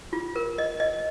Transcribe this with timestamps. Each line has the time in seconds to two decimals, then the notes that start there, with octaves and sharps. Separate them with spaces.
0.13 F4
0.36 A#4
0.58 D#5
0.80 D#5